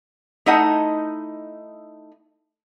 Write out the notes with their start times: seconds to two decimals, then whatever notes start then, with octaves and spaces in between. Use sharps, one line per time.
0.46 A3 D#4 E4 D#5 F#5